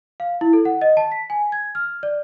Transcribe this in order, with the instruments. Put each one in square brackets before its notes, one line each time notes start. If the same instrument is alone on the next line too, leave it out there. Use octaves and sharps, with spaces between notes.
[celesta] F5
E4
A4
F#5
D#5
A5
B6
G#5
G#6
F6
D5